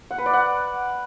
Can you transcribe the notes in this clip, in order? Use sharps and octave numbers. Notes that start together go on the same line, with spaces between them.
F#5
B4
D5
F#5